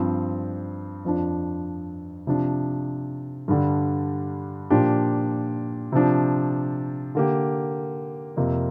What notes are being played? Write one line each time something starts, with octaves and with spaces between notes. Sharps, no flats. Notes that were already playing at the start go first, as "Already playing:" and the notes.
Already playing: G2 F3 C4
F2 F3 D4
C3 F3 D4
G2 D3 G3
A#2 F3 D4 G4
C3 F3 D4
D3 A#3 G4
F2 C3 A#3 F4